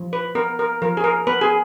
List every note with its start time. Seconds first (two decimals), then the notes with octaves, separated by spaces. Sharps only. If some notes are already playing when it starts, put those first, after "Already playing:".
Already playing: F3
0.13 B4
0.35 B3 A#4
0.59 A#4
0.82 F3 A#4
0.97 G#4
1.04 A#4
1.27 B3 B4
1.41 G#4